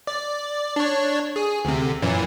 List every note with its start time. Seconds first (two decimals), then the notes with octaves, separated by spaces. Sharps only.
0.07 D5
0.76 D4 C#5
1.36 G#4
1.65 D2 C3
2.02 F#2 A#2 E3